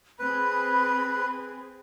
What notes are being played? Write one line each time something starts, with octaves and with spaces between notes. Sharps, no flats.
C4 G#4 B4 B5